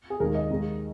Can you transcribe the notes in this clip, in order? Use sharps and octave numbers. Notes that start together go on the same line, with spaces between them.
G#4
D#2 D#3 G#3 A#4
D#5
D#2 D#3 G#3